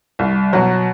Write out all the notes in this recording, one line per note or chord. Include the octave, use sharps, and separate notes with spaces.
C2
B2 F#3